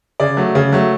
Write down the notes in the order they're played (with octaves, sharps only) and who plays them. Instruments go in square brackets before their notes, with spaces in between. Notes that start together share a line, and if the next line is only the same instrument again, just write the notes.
[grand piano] C#3 D5
F#3 A3
C#3
F#3 A3